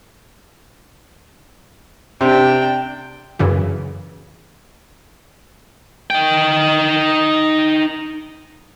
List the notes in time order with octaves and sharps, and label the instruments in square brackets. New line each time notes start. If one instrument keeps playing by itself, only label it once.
[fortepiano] C3 [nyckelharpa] D4 G5
[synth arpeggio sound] F#2 C#3 E3
[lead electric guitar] D#4 G5